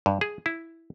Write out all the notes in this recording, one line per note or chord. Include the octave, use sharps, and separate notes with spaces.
G2
G#4
E4